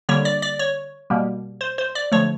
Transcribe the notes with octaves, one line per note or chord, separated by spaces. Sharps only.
D3 G3 A#3 C#5
D5
D5
C#5
B2 G3 A#3
C5
C5
D5
D3 F3 A3 C#5